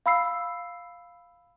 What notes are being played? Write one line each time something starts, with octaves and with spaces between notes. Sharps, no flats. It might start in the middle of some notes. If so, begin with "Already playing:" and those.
F5 B5 E6 C7